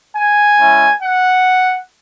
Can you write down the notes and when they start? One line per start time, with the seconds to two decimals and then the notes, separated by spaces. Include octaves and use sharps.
0.17 G#5
0.59 G#3 C#4 E4
1.02 F#5